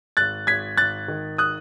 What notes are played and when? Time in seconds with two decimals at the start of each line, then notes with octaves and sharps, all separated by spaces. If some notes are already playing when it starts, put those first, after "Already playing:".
0.17 G#1 F#6 A6
0.47 G#1 G#6 B6
0.77 G#1 F#6 A6
1.08 D#3
1.38 D#6 F#6